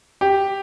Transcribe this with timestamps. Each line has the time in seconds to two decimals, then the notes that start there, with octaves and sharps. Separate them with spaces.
0.21 G4